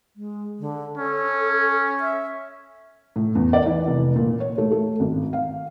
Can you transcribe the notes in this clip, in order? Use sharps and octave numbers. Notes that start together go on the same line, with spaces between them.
G#3
D3
C#4 A4
E5
A2
E2
D5
E3
F1
A#2
C#5
A3
A3
G#1
F5